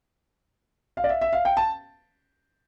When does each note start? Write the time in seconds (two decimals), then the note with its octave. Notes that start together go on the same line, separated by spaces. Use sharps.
0.97 F5
1.04 D5
1.09 E5
1.21 E5
1.33 F5
1.45 G5
1.57 A5